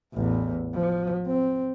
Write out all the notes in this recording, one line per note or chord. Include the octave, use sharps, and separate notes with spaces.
A1 E2
F3
C4